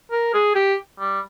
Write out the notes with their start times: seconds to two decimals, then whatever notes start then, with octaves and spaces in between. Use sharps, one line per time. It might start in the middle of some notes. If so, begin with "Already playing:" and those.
0.12 A#4
0.34 G#4
0.55 G4
1.00 G3